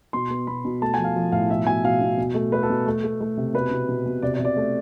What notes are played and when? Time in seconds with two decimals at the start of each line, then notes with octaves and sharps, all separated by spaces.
0.13 B2 C6
0.31 B3
0.47 B2 B5
0.65 B2
0.82 A3 A5
0.94 G#5
0.98 F3
1.04 F5
1.16 F3
1.32 A2 F5
1.50 B2 E5
1.67 B2 G#5
1.85 B2 F5
2.01 B2
2.17 B2
2.35 A3
2.52 A3 B4
2.63 A4
2.70 B2
2.87 A3
3.04 A3
3.21 A3
3.37 C3
3.54 B2 B4
3.71 B2
3.89 B2
4.06 B2
4.22 C3 D5
4.34 D5
4.40 C3
4.45 D5
4.57 A3